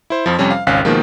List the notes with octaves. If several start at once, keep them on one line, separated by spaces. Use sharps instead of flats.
E4 C5
F2 F3
F2 C3 G3 C#4
F5
G#1 C#2 C#4 F5 F#6 B6
B2 D#3 F3 G#3 A#3